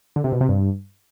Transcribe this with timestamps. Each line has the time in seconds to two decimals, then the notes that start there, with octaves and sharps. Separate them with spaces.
0.16 D3
0.24 C3
0.32 B2
0.41 C3
0.49 G2